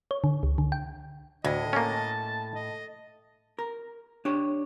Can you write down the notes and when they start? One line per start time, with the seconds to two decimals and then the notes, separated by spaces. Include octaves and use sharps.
0.11 C#5
0.24 D3
0.43 C#2
0.58 D3
0.72 G5
1.45 D2 A2 D#5
1.73 A#3 C#4 A5
2.55 D#5
3.59 A#4
4.25 D4 G4 C#5